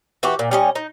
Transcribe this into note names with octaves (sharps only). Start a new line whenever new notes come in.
E3 F#4 G4
A#2
G3 C#4 D#5
D#4